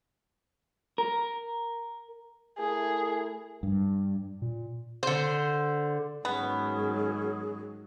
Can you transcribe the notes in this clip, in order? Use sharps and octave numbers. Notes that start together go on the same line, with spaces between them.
A#4
A3 E4 G#4 A#4
G2
A#2
D3 C5
G#2 D#3 F#3 B3 C#4 G#4